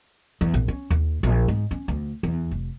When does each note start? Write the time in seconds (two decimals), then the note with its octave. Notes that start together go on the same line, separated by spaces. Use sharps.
0.41 E2
0.54 A#1
0.68 C#4
0.90 D#2
1.23 A#1
1.48 G#2
1.71 C#4
1.88 D2
2.23 E2
2.51 F1